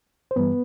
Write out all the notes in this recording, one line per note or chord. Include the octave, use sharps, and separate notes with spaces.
C5
G2 E3 G3 B3 B4